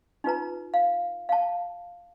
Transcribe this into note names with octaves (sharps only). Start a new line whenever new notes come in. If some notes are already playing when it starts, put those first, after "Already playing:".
D#4 F4 B4 A#5
F5
F5 A5